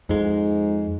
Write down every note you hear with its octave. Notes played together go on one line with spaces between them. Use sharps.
F2 G#2 G#3